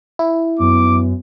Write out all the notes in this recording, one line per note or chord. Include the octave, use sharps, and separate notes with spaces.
E4
F#2 B3 D6